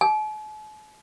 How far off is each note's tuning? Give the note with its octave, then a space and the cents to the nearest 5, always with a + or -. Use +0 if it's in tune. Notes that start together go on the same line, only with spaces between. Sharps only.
A5 -45